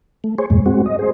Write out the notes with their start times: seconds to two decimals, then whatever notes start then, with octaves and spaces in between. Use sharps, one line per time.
0.24 A3
0.38 G#4 C5 C#5
0.50 E2 G2 A#2 G#3
0.66 G#3 C4 F#4
0.86 D#5
0.99 G#4 C5